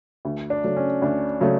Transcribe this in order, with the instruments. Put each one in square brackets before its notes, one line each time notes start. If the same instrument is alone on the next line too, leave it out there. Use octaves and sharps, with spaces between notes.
[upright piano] D2
[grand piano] D4
[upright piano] C#3 F#3 A3
[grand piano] C#4
[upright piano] D2 [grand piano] D4
[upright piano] C#3 F#3 A3